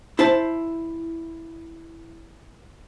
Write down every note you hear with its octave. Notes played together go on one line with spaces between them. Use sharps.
E4 C5 A5